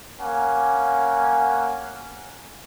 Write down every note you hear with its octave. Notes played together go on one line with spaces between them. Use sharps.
A#3 C#4 F#5 G#5